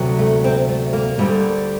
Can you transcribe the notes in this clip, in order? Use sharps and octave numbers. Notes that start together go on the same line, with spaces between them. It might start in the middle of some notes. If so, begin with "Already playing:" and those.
Already playing: D2 C3 F#3
A3
C4
A3
A#3
D2 D3 G3